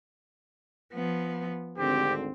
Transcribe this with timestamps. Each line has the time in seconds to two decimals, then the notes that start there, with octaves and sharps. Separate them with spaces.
0.93 F3 B3
1.78 G#1 D2 D3 C4 G4